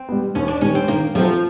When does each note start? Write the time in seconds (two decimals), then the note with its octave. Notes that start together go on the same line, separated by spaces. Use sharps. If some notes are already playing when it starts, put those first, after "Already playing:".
Already playing: C4
0.09 G3 B3
0.35 D#2 C#4
0.48 D4
0.61 D#3 G3 C#4
0.75 C4
0.88 D#3 A#3
1.15 F3 F#3 A3 C4